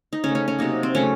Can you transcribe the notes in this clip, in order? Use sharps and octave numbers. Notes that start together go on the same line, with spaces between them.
D#4
C#3 A3 C#4
C#4
C#4
C3 F#3 A#3 D#4
C4
C#3 F#3 A3 C#4